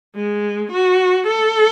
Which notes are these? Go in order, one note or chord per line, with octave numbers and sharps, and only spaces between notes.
G#3
F#4
A4